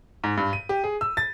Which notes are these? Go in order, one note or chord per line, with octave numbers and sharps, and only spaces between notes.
G#2
G2
D#7
G4
G#4
E6
A6